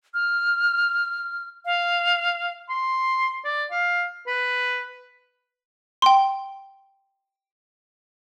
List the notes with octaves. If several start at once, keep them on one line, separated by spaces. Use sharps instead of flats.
F6
F5
C6
D5
F5
B4
G5 C6